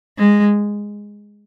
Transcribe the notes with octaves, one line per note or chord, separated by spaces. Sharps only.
G#3